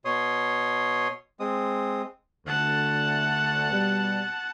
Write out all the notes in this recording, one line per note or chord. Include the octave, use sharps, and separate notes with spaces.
B2 C#5 C6 D#6
G#3 C4 D#6
D2 F#5 A5
B2 G3